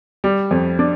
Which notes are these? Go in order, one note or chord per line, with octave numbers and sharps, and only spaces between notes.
G3
F2
D4